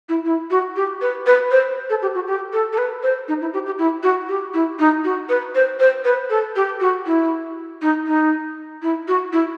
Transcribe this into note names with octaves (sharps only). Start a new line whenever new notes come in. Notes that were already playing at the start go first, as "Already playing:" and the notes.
E4
E4
F#4
G4
B4
B4
C5
A4
G4
F#4
G4
A4
A4
B4
C5
D#4
E4
G4
G4
E4
F#4
G4
E4
D#4
F#4
B4
C5
C5
B4
A4
G4
F#4
E4
D#4
D#4
E4
F#4
E4